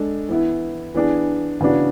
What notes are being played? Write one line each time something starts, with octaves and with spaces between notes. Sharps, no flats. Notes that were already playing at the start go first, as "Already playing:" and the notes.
Already playing: G#3 D4 A4
E3 B3 E4
E3 B3 D4 G#4
C#3 E3 B3 D4 F#4